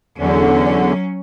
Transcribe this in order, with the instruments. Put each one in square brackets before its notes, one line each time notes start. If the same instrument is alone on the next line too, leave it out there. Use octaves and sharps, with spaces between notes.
[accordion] E2 D3 [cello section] F#3 C#4